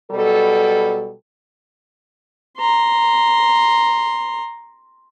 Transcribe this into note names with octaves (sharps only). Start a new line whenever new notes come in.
B2 F#3 G3 A4
A#5 C6